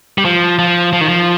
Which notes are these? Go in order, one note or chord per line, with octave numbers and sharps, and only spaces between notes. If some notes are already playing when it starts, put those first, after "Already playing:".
G3
F3
F3
F3
D#3
F3